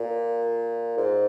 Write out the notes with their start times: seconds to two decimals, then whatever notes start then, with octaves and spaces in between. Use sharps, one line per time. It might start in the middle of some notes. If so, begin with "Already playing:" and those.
Already playing: A#2
0.97 G#2